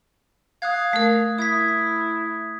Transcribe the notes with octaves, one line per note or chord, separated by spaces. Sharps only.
F5 D#6 F#6 G#6
A3 A#4
E4 D#6 G#6 B6